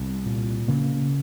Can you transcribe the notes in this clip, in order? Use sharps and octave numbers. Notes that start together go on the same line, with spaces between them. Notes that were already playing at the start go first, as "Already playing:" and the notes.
Already playing: C2 B3
A#2
C#3 A#3